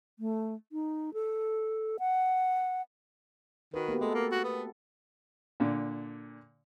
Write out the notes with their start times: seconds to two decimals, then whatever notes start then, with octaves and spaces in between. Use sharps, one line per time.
0.19 A3
0.72 D#4
1.14 A4
1.99 F#5
3.74 D#3 F#4 B4
3.88 A#3 B3 G4
4.01 G#3 A3 A4
4.15 A#3
4.32 F#4
4.44 B3
5.60 A#2 D3